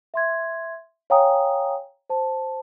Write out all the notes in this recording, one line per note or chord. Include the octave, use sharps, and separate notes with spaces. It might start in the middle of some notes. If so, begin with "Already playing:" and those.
E5 C6 G#6
C#5 F5 G5 G#5 A#5 D#6
C5 A5